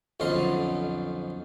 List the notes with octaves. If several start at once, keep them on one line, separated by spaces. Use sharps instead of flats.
B1 F2 D3 C#4 D#5 C6